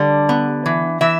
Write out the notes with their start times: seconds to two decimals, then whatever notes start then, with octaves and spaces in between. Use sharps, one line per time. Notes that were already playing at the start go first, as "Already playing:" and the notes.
Already playing: D3 G3
0.29 B3
0.66 E3
1.01 E3 E5